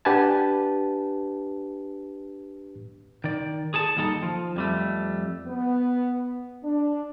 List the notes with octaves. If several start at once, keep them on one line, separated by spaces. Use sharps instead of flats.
D4 G4 B4 F#5 G#5 A5
D#3 D5
G#4 A4 A5
D#2 G3 D#4 A4
F3
F2 G3 A3
B3
D4